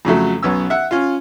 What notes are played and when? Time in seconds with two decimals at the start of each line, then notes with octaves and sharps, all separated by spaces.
0.05 F2 C#3 F#3 A3
0.43 B1 B3 C#4 E6
0.70 E5 F#5
0.91 C#4 F4